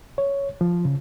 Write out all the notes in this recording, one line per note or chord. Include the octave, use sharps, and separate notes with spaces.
C#5
F3
C#3